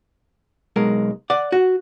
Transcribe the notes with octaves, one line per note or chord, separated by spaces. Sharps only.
B1 G#3 A#4
D5 F#5
F#4